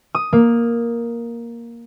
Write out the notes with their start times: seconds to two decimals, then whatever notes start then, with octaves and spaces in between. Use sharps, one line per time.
0.15 D#6
0.33 A#3